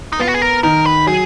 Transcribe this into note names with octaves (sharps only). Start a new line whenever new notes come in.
D#4
B3 F4
F#4
G#4
A#4
D#3 A#4
B4
F#3 G#4